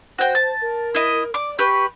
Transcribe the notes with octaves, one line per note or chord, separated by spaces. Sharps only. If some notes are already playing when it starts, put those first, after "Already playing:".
F#4 C5 G5
A5
A#4
E4 D#5
D5 D6
G4 B4 C#6